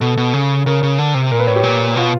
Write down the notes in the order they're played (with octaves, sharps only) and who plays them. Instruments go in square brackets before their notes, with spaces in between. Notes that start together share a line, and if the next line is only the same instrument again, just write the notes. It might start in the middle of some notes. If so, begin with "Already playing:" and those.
[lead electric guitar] B2 [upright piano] A4
[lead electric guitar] B2
C#3
[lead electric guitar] C#3 [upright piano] A#4
[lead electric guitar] C#3
D3
C3
[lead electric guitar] A#2 [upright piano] A#4
[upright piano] B4
[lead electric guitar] A2 [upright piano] C#5
[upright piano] G4
[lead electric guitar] A#2
[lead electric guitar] B2 [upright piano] F4